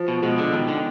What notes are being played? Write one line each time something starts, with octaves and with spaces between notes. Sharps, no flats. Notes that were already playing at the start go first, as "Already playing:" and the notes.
Already playing: F3
B2
B2 G#3
D3
B2 D#3
D3